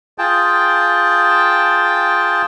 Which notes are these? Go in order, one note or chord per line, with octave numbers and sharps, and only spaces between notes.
F4 G#4 G5 A5